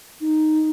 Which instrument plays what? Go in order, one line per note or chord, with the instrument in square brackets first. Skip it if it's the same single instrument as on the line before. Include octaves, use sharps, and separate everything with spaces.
[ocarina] D#4